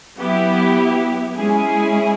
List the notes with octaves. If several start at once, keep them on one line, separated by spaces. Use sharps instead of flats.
F#3 B3 E4 G4
G#3 C#4 E4 G#4